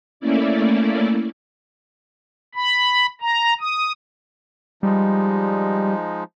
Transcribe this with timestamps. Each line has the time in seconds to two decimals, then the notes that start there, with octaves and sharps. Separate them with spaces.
0.20 A3 A#3 C#4 E4 D5
2.55 B5
3.21 A#5
3.61 D#6
4.83 F3 G3 G#3 D#4